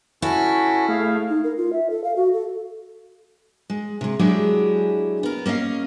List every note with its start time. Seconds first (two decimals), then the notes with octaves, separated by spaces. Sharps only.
0.22 C#4 E4 F#4 A4
0.89 A2 A3 G#4 F5
1.29 D#4
1.44 A#4
1.57 F4
1.73 E5
1.90 A4
2.04 F5
2.16 F#4
2.33 A4
3.70 G#3
4.01 C3 G#3
4.19 F#3 G#3 D4 E4 G4 G#4
5.23 B3 A#4
5.46 A#3 C#4 D#5 F5